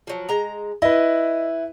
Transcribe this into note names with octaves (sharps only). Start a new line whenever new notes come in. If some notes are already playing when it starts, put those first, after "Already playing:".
F3 F#3
G#3 A#5
E4 B4 D#5